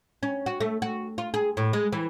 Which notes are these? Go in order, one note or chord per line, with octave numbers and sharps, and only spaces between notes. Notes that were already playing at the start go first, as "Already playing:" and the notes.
C#4
F#4
A3
F#4
F4
G#4
A2
G#3
E3